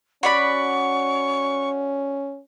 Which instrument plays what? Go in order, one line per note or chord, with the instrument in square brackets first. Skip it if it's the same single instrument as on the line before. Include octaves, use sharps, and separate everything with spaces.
[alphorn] C#4 [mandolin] F#4 D5 B5 [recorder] C#6